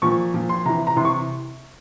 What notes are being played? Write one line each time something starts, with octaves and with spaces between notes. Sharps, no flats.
A#2 F3 C#6
A#2 F3
C6
C3 E3 A#5
A#5
C3 E3 C6
C#6